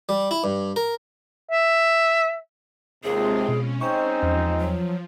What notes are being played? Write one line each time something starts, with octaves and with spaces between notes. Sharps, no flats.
G3
E4
G2
A#4
E5
D#2 C3 G#3 C4 F4 G#4
B2 C#4
G#3 C4 D#4 C5 G5 C#6
E2 F3
F#3